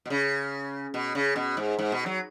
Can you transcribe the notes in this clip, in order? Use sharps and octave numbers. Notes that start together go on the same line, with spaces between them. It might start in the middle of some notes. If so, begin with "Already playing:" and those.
B2
C#3
B2
C#3
B2
G#2
G#2
B2
F#3